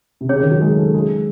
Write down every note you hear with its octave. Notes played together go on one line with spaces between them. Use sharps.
C3
C#3 C#4 G#4 C#5
D#3
F#3
G#3
A3
G#3